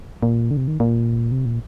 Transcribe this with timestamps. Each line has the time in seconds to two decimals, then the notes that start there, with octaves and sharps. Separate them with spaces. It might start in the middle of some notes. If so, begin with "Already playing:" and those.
0.23 A#2
0.51 D3
0.57 C3
0.68 D#3
0.80 A#2
1.32 C3
1.45 A#2